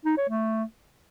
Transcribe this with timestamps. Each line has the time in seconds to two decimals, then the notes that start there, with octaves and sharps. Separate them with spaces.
0.05 D#4
0.17 C#5
0.29 A3